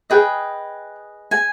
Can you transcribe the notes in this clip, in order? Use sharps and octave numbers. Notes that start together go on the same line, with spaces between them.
G#4 B4 D#5 G5
G#5